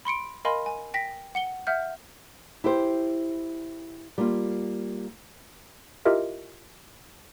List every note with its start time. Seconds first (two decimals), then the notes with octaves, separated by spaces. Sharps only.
0.05 B5 C6 C#7 D7
0.45 A#4 D#5 F5 G#5 B5 C6
0.66 G#5
0.94 G5 A#6 B6
1.35 F#5 C#7 G7
1.67 E5 F#5 F6 G6
2.64 E4 G4 C5
4.18 G3 A#3 F4
6.05 E4 F4 G4 A#4 D#5 E5